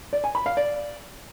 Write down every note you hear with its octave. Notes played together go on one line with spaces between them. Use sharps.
D5
G#5
B5
F5
D5